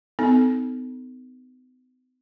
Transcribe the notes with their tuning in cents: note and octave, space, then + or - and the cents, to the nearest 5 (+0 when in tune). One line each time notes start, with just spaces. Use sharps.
B3 +45 D#4 +5 A4 +0